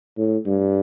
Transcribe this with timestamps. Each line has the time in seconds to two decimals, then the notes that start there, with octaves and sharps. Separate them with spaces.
0.17 A2
0.46 G2